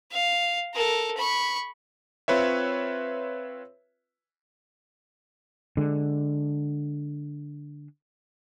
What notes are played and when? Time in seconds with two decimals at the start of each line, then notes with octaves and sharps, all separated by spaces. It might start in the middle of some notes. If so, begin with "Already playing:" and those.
0.12 F5
0.74 A4 A#4
1.17 B5 C#6
2.28 C4 F4 B4 C#5 E5
5.77 D3 G#3